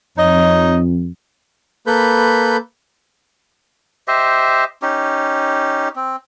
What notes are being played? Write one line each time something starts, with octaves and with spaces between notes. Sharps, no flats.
F2 D#4 C#5 D#5
A#3 A4 B4 B5 G6
G4 C5 D#5 E5
C#4 D#4 G4
C4